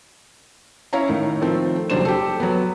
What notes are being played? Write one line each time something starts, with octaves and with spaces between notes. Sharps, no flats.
C#4 E4 C#5 F5 A#5
A2 D#3
D#3 F3 A3 C4
F#1 F#3 G3 D4 C5 E7
G4 A4
F#3 B3